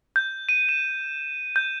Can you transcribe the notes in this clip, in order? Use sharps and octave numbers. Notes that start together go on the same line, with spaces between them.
G6
D#7
E7
G6